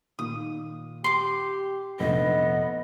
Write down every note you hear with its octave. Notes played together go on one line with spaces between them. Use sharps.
A#2 D#3 D#6
G4 C6 D6
F1 A#1 B3 D#5